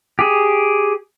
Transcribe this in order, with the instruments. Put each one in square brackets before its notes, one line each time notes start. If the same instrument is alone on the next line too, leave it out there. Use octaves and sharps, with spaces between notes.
[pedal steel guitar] G4 G#4